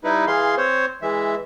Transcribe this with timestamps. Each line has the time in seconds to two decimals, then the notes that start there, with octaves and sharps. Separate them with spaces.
0.04 G3 D#4 E4 B4
0.27 E3 G#4 F5 C6
0.57 C4 C5 C#5
1.02 E3 G#3 E5